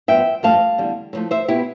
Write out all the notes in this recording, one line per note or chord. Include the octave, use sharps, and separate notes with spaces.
G2 F3 B3 E5 G5
G2 F3 A3 F5 A5
E2 D3 G3
A2
F3 A3
C5 E5
B2 B3 E4 G4